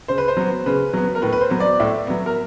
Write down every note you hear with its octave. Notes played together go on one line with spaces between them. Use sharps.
C#3 C5
B4
C5
F#3 B3
C#3 B4
F#3 B3
A#4
A2 B4
B4
C5
F#3 B3
D5
A2 E5
F#3 B3
A#4